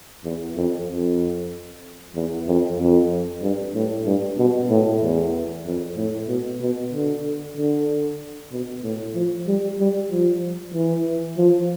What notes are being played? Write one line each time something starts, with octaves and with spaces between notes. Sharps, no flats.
E2
F2
F2
E2
F2
F2
G2
A2
G2
B2
A2
E2
F2
A2
B2
B2
D3
D3
B2
A2
F3
G3
G3
F3
E3
F3